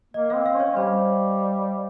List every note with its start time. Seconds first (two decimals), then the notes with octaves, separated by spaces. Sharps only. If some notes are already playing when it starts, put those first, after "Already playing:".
0.14 A#3 D#5
0.30 C4 F5
0.46 F5
0.55 C#4 C#5
0.76 G3 C5